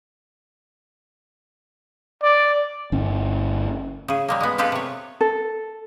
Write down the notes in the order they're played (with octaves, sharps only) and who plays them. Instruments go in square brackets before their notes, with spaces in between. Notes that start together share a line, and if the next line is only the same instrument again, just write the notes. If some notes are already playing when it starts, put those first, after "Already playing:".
[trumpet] D5
[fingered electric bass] G1 C#4
[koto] C#3 G#4
G3 G#3 A#3
G#3 B3
G#3 F4 G4 A4 B4
C3 C#5
[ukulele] A4